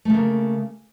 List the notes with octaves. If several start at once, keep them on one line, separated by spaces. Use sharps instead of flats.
C#3 A3 A#3